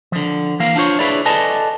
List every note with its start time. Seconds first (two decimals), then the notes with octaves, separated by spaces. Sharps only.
0.12 D3 F3
0.60 E3 A#3 F5
0.76 D4 F4 C5 C#5
0.99 D4 E4 G#4 B4 C#5 D5
1.25 A4 B4 D5 D#5 G#5 A5